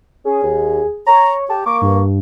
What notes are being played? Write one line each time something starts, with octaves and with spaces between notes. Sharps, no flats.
C#4 G#4
D#2
C#5 A#5
G4 A5
A#3 C#6 D6
G2